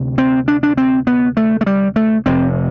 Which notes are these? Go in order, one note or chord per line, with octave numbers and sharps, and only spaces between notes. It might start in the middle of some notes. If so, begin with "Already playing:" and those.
Already playing: D2 C3
C4
D4
D4
C4
B3
A3
A3
G3
A3
F1 F2 C3 C4